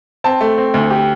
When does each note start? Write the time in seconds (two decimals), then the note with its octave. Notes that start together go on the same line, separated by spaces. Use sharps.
0.24 C4 A5
0.41 A3
0.57 C4
0.74 D2
0.90 G4